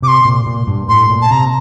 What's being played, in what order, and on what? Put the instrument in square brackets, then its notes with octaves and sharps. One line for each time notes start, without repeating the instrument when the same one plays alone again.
[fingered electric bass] C3 [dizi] D6
[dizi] C6
[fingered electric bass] A#2
A#2
G2
[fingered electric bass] A2 [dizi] C6
[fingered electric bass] A#2
[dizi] A5
[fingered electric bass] C3 [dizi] A#5